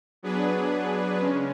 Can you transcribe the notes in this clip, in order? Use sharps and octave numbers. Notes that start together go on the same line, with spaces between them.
F#3 B3 D4 G#4 B4
C#3 G#3 C#4